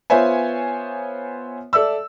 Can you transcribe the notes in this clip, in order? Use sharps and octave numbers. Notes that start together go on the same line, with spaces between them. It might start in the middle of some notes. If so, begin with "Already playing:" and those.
B3 F4 C5 C#5 E5 G#5
A4 D5 E5 E6